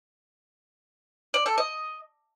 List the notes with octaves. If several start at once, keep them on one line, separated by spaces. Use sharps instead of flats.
D5
A4
D#5